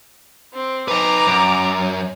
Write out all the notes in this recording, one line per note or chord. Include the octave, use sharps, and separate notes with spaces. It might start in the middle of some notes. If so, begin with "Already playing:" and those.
C4
D#4 B4 A#5 D6
F#2